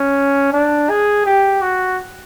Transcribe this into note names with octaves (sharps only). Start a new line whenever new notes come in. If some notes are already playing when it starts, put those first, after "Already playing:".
Already playing: C#4
D4
G#4
G4
F#4